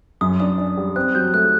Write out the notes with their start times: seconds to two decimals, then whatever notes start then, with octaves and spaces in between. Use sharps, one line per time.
0.21 F#2 D#6
0.40 D4 D#6
0.58 D4
0.77 G3
0.96 C4 F#6
1.15 F#3 G6
1.34 A3 F#6